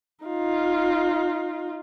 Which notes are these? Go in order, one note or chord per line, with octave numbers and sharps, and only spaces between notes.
D#4 F4